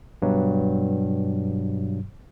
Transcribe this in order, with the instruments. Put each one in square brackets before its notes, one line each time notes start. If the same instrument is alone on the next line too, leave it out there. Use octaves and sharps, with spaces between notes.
[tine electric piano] G2 B2 F#3